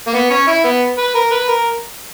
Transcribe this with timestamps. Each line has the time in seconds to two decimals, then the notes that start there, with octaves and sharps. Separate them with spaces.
0.07 A#3
0.14 B3
0.30 C#4
0.47 E4
0.64 B3
0.98 B4
1.15 A#4
1.31 B4
1.48 A#4